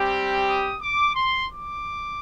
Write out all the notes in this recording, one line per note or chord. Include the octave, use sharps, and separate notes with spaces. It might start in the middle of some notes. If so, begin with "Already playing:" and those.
Already playing: G3 C4 G4
D#6
D6
C6
D6